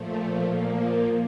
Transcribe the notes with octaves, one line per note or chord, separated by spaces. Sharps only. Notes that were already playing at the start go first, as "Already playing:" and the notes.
Already playing: A#2 F3 A3
A#2 F3 A#3